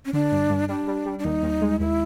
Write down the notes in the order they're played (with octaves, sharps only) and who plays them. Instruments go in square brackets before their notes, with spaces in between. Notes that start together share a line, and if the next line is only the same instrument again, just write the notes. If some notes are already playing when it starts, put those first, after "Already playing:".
[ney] C#4
[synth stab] D3 [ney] D4
[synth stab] G2
G2
[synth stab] G3 [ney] D4
[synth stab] G3
G3
[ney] D4
[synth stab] D#2 [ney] D#4
[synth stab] D#2
G#3
[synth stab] D#2 [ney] E4